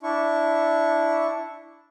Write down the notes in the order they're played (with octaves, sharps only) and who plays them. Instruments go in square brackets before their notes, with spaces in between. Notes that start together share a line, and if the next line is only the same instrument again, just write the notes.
[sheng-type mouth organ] D4 E4 C#6